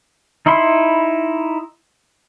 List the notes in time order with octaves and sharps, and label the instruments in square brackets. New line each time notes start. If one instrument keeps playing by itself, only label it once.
[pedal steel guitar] D#4 E4 B5 C6